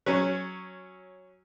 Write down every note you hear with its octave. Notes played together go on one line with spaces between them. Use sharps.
F#3 C#4